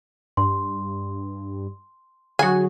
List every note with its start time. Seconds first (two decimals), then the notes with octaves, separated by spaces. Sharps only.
0.37 G2 C6
2.39 D3 F#3 F#4 G#4 G#5